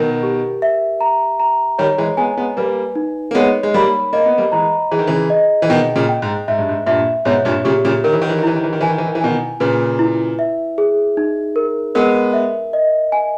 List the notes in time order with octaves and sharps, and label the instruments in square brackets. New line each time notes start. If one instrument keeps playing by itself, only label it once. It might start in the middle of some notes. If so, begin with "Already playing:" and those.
Already playing: [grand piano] B2 D#3 [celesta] A#4
[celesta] G4
E5
A#5
A#5
[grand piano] D#3 G3 [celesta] C#5
[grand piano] E3 G#3
[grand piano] G#3 B3 [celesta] G#5
[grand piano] G#3 B3
[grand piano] G3 A#3 [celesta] B4
[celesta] D#4
[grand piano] A#3
[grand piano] G#3 B3 [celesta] C#5
[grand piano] G#3
[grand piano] G3 A#3 [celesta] B5
[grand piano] A#3 [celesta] D#5
[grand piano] B3
G3 A#3
[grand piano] E3 G#3 [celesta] A#5
[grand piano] E3 [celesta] G#4
[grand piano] D#3
C#3 E3
[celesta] D#5
[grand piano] E3
[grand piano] B2 D#3 [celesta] G5
[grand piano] A#2 C#3
[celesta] G5
[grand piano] G#2
[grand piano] G#2 [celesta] E5
[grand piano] G2
G#2
[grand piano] G2 A#2 [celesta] E5
[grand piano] G#2 B2 [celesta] C#5
[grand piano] G2 A#2
[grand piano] A#2 C#3 [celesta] G4
[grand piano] A#2 C#3
[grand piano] D#3 [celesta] A#4
[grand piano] E3
D#3
E3
D#3
[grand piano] E3 [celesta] E4
[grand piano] D#3
E3
D#3
[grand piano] E3 [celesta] G#5
[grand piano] D#3
E3
D#3
E3
[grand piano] B2 D#3 [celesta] G#5
[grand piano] A#2 C#3 [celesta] B4
[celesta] E4
E5
G#4
D#4
A#4
[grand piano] G#3 B3 [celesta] A#4
[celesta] E5
D#5
G#5